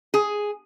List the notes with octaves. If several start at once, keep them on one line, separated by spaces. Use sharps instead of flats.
G#4